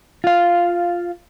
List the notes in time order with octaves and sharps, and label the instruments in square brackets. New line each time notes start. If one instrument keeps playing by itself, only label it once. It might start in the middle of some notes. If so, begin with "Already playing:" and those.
[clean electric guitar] F4 F5